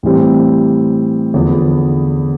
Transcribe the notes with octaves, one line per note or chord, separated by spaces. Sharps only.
A2 E3 G3 C4
E2 D3 F3 B3